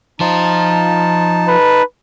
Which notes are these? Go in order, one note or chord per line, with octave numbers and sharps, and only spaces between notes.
F3 D#4 C5 A5
B4